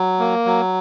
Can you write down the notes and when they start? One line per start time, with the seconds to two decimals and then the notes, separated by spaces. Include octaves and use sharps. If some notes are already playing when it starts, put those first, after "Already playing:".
Already playing: F#3
0.19 A#3
0.45 F#3